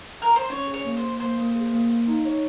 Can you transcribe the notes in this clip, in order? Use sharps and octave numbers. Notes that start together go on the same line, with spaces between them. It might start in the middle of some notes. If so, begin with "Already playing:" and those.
A#4
C5
C#4 C#5
G#4
C#5
A#3
C5
A#3
A#3 C5
A#3
G#4
A#3
F5
D#4
C#5